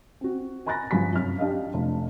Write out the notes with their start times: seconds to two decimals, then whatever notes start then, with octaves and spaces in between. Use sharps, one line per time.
0.21 C4 F#4
0.66 G#5 A#5 B5 F#6 A6 A#6
0.91 G2 F3 F#3 G#5 B5 B6
1.13 F#2 C3 C#4 F6
1.38 D4 G4 D#5 F5
1.74 F1